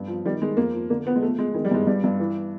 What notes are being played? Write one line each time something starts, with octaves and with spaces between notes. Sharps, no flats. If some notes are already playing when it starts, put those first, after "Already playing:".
Already playing: G2
F3
D#3 G3
D#3 G#3
F2 A#3
F3
D3 A#3
F3 B3
G#3
F3 A3
F3 G#3
D#3 G#3
G3
G2 G#3
G2 G3
G2
E3